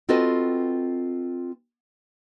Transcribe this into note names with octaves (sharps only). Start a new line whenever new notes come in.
C4 F4 F#4 A4 B4 D#5